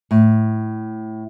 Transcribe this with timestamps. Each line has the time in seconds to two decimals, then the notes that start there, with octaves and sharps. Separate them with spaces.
0.11 A2